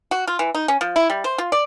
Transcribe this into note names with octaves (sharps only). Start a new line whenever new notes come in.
F#4
F4
E3
D#4
C#4
F3
E4
G3
C5
F4
D5